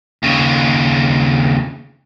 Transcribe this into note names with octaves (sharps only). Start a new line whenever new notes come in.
D#2 C#3